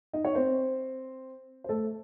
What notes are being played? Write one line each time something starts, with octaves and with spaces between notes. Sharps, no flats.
D#4 D#5
C#5
C4 C5
C5
A3 A4